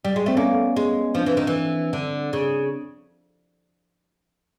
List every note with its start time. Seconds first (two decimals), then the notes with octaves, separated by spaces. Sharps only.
0.05 G3
0.16 G#3
0.26 A3 C4
0.37 A#3 B3 C#4
0.76 G#3
1.15 F3 C4 D4
1.26 E3
1.37 D#3
1.47 E3
1.93 D3
2.33 C#3